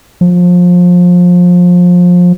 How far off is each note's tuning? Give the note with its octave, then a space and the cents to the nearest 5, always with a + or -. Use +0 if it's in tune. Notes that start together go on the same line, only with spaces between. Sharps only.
F3 +25